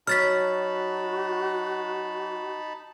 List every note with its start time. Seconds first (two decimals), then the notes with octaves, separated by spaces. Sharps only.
0.07 F#3 D#4 F#4 A5 B5 F6 A6 B6